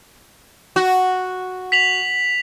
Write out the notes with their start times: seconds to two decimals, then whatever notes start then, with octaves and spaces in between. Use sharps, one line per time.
0.76 F#4
1.72 B6 F7 F#7